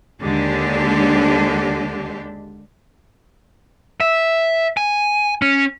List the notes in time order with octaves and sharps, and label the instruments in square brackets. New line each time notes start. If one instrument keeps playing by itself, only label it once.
[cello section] D#2 D3 G#3 D4 G4
[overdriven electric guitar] E5
G#5
C#4